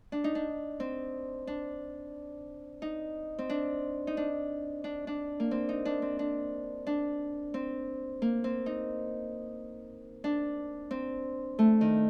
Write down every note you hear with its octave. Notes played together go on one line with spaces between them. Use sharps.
D4
D#4
D4
C4
D4
D#4
C4
D4
D#4
D4
D4
D4
A#3
C4
D#4
D4
C4
D4
D4
C4
A#3
C4
D#4
D4
C4
A3
D#3